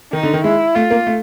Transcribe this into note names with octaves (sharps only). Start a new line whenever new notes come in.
D#3 D#4
D3
D#3
G#3 E4
A3 F4
A#3
A3